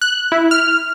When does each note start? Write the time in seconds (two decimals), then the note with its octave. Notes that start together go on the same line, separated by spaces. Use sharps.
0.01 F#6
0.32 E4
0.51 F6